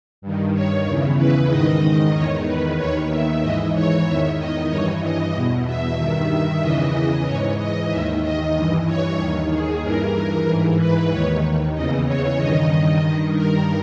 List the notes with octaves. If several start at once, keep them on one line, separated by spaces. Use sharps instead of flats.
G2 D#3
C#5
E2 C#3 E3
B4
G#2 D#3 D#5
E2 D#3 C#5
B4
D#2 D#3 C#5
E5
G#2 E3 D#5
C#5
E2 D#3 E5
D#5
G2 E3 C#5
D#5
E2 B2
E5
G2 D#3 E5
E2 C#3 E3 D#5
G#2 E3 C#5
D#5
D#2 D#3 E5
D#5
G2 E3 D#5
C#5
D#2 D#3
G#4
G2 E3 A#4
G#2 E3
B4
D#2 D#3 C#5
E2 C#3 E3 D#5
C#5
G2 D#3 D#5
G2 D#3 D#5
A#4